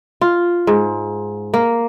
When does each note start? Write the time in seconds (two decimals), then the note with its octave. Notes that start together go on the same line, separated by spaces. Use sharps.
0.21 F4
0.67 G#2
1.54 A#3